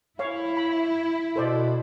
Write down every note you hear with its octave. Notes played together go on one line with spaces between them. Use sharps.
E4 C#5 F5
B5
B2 A4 C5 D5